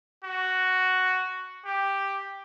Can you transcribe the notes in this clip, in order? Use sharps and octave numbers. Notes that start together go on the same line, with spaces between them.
F#4
G4